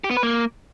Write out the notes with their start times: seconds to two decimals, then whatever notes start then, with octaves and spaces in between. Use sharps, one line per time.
0.04 G4
0.11 B3
0.17 B4
0.23 A#3